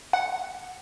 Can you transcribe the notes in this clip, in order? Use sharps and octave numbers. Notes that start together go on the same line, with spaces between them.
F#5